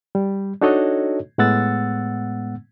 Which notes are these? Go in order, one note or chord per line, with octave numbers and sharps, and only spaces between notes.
G3
D4 D#4 F#4 A4 C#5 D#5
A2 G#3 B3 F#5 E6 A6